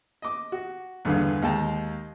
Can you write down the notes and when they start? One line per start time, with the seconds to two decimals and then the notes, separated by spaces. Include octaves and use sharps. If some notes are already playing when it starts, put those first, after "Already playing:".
0.22 D#5 D6
0.52 F#4
1.05 E2 G2 D3 B3 G#4 F5
1.42 D#2 G#3 G5 A5 A#5